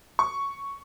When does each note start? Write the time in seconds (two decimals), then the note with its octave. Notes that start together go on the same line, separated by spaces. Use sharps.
0.19 C#6